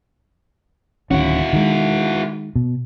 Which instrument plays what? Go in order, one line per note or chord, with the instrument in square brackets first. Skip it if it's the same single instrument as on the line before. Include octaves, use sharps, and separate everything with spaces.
[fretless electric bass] D1 D#3 C#4 [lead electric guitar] E4 F#4
[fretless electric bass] D#3 G#3
B2